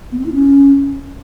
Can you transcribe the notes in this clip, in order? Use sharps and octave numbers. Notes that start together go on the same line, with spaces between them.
B3
C4
E4
C#4